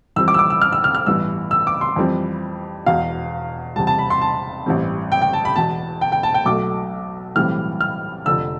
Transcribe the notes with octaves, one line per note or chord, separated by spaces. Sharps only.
F2 E3 G3 C4 E6
D6
E6
D6
E6
F6
E6
F6
F6
A1 G2 E3 B3 E6
E6
D6
C6
F2 E3 G3 C4
E1 E2 B2 F5
E2 C3 G3 A5
A5
B5
C6
A5
A1 G2 E3 G3 C4
G5
G5
A5
B5
E1 E2 B2 A5
G5
G5
A5
G5
B1 B2 A3 D6
B1 A2 E3 G3 C4 F6
F6
F1 F2 D3 E6